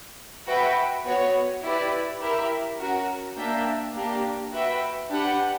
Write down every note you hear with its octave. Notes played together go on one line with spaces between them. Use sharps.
F#4 B4 E5 G5
B3 F#4 C#5
E4 G4 B4 D5
E4 G4 A#4 E5
C#4 F#4 A#4
A#3 D4 A#4 E5 G5
A#3 D4 G4
F#4 B4 E5 G5
D4 G4 B4 F#5